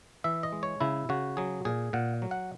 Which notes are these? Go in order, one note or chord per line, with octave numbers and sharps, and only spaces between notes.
E3 E5
D#5
G#3
C#5
C#3 E4
C#3 F#4
F#3 G#4
A#2 G#4
A#2 F#5
F#3
F#5